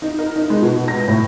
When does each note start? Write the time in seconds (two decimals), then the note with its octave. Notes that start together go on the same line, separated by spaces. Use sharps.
0.02 D#4
0.19 A#4
0.36 D#4
0.50 G#3
0.62 B2
0.88 A#6
1.08 A2